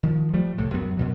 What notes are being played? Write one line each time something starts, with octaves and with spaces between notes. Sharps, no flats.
D#3 F3
F3 G3 A3
C2 A2
F#2 F#3 B3
F#2 B2 F#3